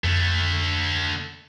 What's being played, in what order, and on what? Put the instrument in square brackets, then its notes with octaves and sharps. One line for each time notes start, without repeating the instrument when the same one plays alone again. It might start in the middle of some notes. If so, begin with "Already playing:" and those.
[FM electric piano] F2 [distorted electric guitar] D3 A3